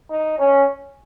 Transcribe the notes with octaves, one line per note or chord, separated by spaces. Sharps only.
D#4
C#4